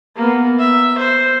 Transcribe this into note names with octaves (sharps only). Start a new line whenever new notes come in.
A#3 B3
E5
C5